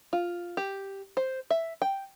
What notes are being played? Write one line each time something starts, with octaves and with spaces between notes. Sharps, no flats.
F4
G4
C5
E5
G5